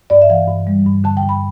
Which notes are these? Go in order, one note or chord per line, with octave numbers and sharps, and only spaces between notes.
G2 D5
E5
E3 F5
G2
G3
G2
D3 A5
G5
G2
B5